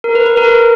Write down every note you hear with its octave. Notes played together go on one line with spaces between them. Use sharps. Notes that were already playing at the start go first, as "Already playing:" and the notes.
A#4
B4
B4
A#4